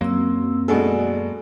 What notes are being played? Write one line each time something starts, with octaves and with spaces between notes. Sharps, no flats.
F#2 F#3 A#3 C4 E6
B2 G#3 F#4 A4 D5 G#5